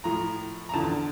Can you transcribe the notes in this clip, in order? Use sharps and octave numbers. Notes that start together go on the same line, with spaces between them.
A2 F3 A#5
A#5
E2 D3 F3 A5